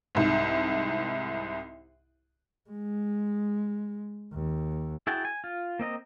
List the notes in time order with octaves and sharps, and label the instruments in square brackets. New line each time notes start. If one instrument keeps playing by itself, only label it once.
[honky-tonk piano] C2 G#2
[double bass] G#3
D#2
[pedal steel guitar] E4 F#4 G#4 G5 A5
G#5
F4
A#3 C4 D#5 A#5